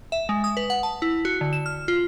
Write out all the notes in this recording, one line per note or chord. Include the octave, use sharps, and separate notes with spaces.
E5
G#3
D#6
B4
F#5
A5
E4
F#4
D3
E7
F6
F4